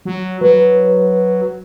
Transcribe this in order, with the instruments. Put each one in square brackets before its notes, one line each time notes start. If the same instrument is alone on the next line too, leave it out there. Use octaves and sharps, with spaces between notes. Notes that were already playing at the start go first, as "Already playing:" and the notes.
[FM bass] F#3
[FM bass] F#3 [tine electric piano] B4